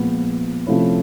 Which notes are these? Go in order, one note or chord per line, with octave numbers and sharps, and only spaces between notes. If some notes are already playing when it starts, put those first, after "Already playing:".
Already playing: A#2 F3 G#3 B3
C3 F3 A3 C#4 E4